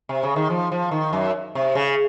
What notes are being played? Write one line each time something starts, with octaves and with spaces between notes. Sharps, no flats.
C3
C#3
D#3
F3
F3
D#3
F#2
C3
C#3